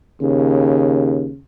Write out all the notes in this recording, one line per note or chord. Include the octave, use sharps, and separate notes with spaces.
D#2 C#3